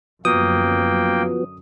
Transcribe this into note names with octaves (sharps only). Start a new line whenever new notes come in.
F#2 D3 F3 F#3 A#3 B3 G5 D#6